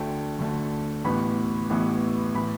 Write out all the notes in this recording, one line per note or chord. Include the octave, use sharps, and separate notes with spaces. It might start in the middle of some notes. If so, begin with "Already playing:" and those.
Already playing: D2 D3 A3 G5
D2 D3 A3
A1 A2 E3 B3 B5
A1 A2 E3 B3
A2 E3 B5